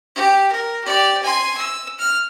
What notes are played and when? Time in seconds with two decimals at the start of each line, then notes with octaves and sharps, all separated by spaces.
0.15 G4
0.52 A#4
0.84 G4 D5
1.23 G#5 C6
1.57 E6
1.99 F6